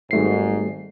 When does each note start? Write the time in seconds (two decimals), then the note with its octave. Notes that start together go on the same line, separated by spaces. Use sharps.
0.11 G#1 G#2 G3 A3 C7